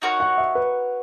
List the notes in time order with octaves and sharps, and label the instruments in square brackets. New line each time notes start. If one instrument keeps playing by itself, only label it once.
[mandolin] D#4 F#4 A#4 C#5
[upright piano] F#5
E5
B4